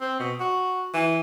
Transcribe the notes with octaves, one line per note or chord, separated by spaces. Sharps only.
C4
B2
F#4
E3